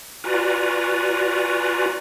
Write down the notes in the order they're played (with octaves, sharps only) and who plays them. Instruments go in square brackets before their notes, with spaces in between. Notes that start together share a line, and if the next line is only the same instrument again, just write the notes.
[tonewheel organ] F4 F#4 B4 D5 G#5 A#5